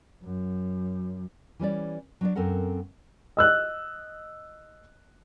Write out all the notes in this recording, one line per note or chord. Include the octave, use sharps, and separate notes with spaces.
F#2
E3 G3 C#4 D5
F#3 D4 D5
F#2 C4 A4 A#4 F#5
D#5 E6 F#6